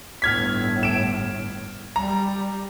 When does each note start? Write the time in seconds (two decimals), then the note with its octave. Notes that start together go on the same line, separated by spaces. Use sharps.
0.22 G1 A2 F6 G#6 B6
0.83 D7 E7
1.96 G3 A#5